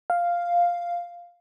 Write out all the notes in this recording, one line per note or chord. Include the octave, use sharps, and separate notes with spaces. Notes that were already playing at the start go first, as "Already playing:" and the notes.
F5